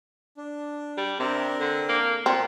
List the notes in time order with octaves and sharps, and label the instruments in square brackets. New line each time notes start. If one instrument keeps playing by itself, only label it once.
[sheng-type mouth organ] D4
[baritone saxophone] G3
[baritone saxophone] C3 [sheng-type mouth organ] C4 D4 A#4
[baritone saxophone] D3
A#3
[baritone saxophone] A#2 [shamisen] C4